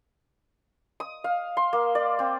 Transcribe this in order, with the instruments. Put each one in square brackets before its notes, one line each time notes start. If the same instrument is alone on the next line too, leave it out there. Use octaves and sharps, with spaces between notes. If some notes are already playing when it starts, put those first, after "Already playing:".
[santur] D#6
F5
C6
A#3
D5
C4